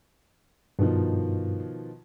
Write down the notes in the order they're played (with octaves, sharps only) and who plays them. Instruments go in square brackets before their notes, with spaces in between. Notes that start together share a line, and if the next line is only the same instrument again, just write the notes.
[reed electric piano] G2 [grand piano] B2 D#3 F3